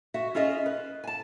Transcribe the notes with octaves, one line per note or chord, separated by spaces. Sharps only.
F#4 E5
C#4 F4 G#4 D#5 E5
B4
G#5 A5